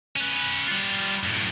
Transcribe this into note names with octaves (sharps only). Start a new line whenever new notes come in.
C#4 B4
G3 F4
F#2 A2